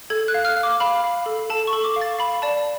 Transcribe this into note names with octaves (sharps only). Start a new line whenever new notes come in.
A4 G#6
F#6
F5
F6
F5
D6
F5 B5
F5
A4
A4 A5
C#6
A4
D6
F5
A6
F5 B5
D5 A5